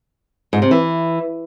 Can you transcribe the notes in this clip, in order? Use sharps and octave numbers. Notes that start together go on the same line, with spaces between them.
G#2
C3
E3